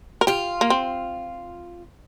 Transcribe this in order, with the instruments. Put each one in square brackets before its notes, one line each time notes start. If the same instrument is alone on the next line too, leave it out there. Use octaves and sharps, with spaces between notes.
[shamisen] A#4
[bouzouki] F4 [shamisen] G4
[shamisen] A#3
C4